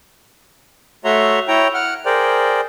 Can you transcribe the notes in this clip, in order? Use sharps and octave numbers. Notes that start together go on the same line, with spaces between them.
A3 F#4 C#5 E5 A#5 C6
E4 C#5 G5 A#5
F#5 F6
G#4 A#4 C5 D5 G5